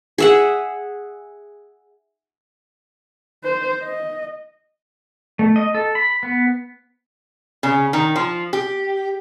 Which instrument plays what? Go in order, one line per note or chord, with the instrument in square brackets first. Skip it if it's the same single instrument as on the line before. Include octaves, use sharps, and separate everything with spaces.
[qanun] G#4 E5 F#5
[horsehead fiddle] C5
D#5
[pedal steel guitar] A3
D#5
A4
B5
B3
[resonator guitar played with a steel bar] C#3
D#3
F3
G4